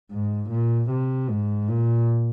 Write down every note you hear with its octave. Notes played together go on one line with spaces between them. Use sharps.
G#2
A#2
C3
G#2
A#2